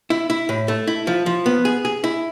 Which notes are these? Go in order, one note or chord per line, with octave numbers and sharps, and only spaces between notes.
E4
E4
A2
A3
E4
F3
F3
B3
G#4
G#4
E4